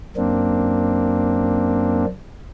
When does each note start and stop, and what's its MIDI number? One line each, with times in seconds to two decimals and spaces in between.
0.16 2.05 42
0.16 2.05 58
0.16 2.05 60
0.16 2.05 62